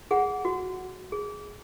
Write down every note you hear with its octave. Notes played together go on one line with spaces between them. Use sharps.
G#4 F#5
F#4
G#4